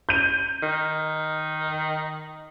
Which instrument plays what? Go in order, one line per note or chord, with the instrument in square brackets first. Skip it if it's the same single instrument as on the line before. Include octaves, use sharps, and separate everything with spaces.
[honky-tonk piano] G6 D#7
[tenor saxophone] D#3